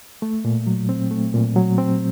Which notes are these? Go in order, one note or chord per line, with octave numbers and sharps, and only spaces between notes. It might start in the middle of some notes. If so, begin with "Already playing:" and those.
A3
A#2
F#3
C4
A3
A#2
F#3
C4